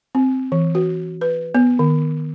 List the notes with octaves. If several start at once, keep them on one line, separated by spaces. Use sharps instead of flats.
C4
E3
F#4
B4
B3
D#3